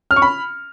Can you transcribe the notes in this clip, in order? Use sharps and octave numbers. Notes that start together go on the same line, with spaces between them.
F6
C#6
B5